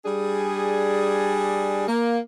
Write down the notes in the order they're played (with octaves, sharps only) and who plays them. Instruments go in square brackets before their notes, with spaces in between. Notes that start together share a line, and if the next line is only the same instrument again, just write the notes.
[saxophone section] G3 D4 G#4
A#3